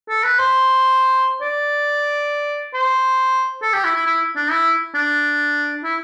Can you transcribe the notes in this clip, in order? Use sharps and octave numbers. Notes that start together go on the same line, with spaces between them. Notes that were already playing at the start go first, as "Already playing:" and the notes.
A4
B4
C5
D5
C5
A4
G4
E4
E4
E4
D4
E4
D4
E4